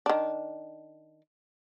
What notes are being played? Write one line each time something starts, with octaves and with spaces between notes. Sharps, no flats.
D#3 D4